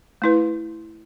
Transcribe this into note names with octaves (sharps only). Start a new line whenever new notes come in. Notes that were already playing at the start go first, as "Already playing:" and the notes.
A3 E4 B4